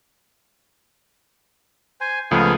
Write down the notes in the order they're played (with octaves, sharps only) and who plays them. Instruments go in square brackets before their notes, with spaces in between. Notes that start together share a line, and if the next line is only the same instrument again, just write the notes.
[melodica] C5 G#5
[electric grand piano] C#2 F3 A3 [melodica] B3 G#4 F5